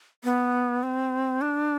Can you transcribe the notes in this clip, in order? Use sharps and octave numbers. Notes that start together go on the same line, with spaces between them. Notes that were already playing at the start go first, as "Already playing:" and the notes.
B3
C4
D4